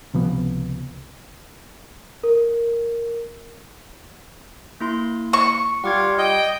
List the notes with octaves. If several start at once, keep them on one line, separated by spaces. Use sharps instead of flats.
C#2 C3 F3 B3
A#4
A#3 E4 C6
C#6
G3 F4 F#5 D6 G#6
D#5 G5